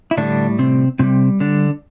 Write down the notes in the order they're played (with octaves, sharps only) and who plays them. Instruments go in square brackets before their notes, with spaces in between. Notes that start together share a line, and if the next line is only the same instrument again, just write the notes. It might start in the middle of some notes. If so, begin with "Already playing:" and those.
[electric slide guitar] E4
A2 D3 G3 D4
C3 C4
A2 C3 G3 C4
D3 D4